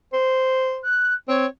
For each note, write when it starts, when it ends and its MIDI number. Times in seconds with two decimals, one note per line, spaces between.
0.13 0.83 72
0.84 1.14 90
1.28 1.46 60
1.28 1.47 73